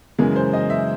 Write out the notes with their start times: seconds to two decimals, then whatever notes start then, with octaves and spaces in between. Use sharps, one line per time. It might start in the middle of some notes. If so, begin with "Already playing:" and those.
0.18 F#2 C#3 E3 G#3 A#4
0.36 C5
0.53 D#5
0.70 E5